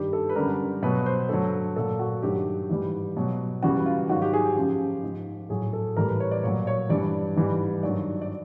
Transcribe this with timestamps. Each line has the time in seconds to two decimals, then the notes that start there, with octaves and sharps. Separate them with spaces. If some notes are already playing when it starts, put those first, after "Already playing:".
Already playing: G2 D#3 G3 G4
0.13 A4
0.29 B4
0.36 F#2 D3 G3 A#4
0.82 B2 F#3 B4
1.06 C5
1.29 G2 D3 F#3 A4
1.76 A#2 F#3 A4
1.99 F#4
2.22 G2 D#3 F#3 G4
2.69 G#2 E3 G3
3.16 B2 F#3
3.63 F#2 C#3 E3 G3 F#4
3.86 F4
4.09 G#2 D#3 F#3 F#4
4.22 G4
4.33 G#4
4.45 G4
4.56 F#2 C#3 F3
5.03 G#2 F3
5.49 A2 F#3 G#4
5.73 A4
5.97 A2 E3 G3 A#4
6.08 B4
6.20 C#5
6.31 D5
6.43 A#2 F#3 C#5
6.67 C#5
6.89 G2 E3 G3 D5
7.36 G#2 E3 G3
7.83 G2 D#3 F#3 D5
8.22 D5